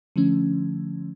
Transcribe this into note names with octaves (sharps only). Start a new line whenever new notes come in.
D3 F3 A3 C#4